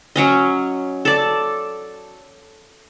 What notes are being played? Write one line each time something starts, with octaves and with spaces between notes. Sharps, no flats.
F#3 C#4 D#5
A4 D5